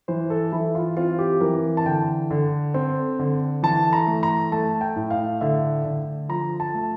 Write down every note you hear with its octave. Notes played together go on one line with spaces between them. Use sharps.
E3 C5
A4
E3 E4
F4
C4 F4
G4
E3 A#4
A5
D3 G5
D3
C4
D3
E3 A5
A#5
A3
A#5
A3 A5
G5
A2
F5
D3 E5
D3
F3 A#5
A5
A3